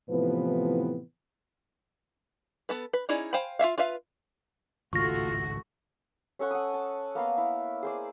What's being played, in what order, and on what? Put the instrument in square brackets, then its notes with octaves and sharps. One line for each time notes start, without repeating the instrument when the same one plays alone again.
[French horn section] A2 C3 E3 F3 B3 B4
[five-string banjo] B3 A4 B4
B4
C#4 D#4 E4 G#4 D5
C5 F5 G5 G#5 B5
F4 F#4 E5 F5
F4 B4 E5 F5
[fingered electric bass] G#1 C#2 A2 [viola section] A3 F#4 [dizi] F4 [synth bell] C#6 A#6
[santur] C#4 A4 C#5 F#5
F#5 D#6
A5
A#3 B3 D#5 F5
E4
G#4 C5 D5